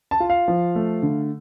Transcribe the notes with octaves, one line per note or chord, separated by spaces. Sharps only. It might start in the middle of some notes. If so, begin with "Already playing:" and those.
A5
F4
F5
F3
A3
D3